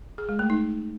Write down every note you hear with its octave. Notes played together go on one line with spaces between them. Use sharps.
G#4
G#3
A3
D#4